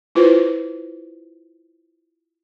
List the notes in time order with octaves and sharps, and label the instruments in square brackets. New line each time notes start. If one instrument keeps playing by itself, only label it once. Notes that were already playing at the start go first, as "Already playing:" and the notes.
[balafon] E4 F4 B4 C5